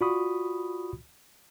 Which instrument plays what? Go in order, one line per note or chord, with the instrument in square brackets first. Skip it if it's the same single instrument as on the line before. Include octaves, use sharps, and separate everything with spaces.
[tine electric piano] F4 F#4 D5 B5 C#6 D#6